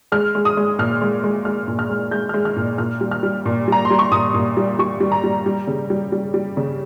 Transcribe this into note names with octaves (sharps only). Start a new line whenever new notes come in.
G#3 F6
G#3
D#6
G#3
A#2 F6
G#3
G#3
G#3 F6
A#2
F6
G#3
G#3 G6
G#3 F6
F6
A#2
A#2 F6
G3
F6
G3
A#2
G3 A#5
C6
G3
C#6
A#2 D#6
A#2
G3
G3 C#6
G3
A#5
G3
G3
C#3
G3
G3
G3
C#3